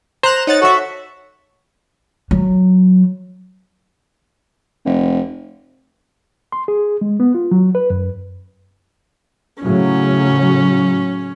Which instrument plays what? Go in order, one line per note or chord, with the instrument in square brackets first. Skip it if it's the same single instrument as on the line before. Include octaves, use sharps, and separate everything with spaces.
[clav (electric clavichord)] C5 [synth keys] A#5 F#6 E7
[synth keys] D#4 F#5 A6 [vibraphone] C#5
[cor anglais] F#4 [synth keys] A4 E5
[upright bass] F#3
[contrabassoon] F1
[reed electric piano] C6
G#4
G#3
B3
F4
F#3
B4
F#2
[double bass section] A2 C#3 F#3 [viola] C#4